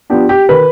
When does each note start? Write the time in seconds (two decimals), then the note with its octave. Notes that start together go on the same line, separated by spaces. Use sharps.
0.10 F3 B3 D4 G4
0.29 G4
0.49 D#3 B4